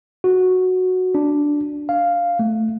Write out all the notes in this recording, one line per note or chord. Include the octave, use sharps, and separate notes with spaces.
F#4
D4
F5
A3